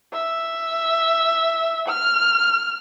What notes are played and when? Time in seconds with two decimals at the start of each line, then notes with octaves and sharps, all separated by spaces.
0.13 E5
1.88 F6